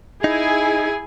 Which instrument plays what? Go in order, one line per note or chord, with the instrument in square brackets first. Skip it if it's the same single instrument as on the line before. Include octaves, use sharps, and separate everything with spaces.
[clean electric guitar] D#4 [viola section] E4 G#4 G#5